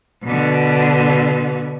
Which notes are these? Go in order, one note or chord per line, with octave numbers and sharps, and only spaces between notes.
B2 D3